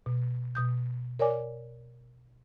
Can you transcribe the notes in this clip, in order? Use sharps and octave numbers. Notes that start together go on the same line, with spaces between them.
B2
B2 D#6 G6
A#4 C#5 D5 G#5 D6